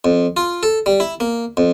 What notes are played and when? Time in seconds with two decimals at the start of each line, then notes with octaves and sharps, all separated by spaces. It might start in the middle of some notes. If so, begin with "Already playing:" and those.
0.05 F2
0.37 F4
0.63 A4
0.86 G3
1.00 E4
1.20 A#3
1.57 F2